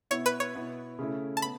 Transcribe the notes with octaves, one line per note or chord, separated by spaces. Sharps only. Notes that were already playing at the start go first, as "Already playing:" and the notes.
B2 B3 E4 C#5
B4
C#5
B2 B3 E4
C#3 A3 C#4 E4
A5
B3 B5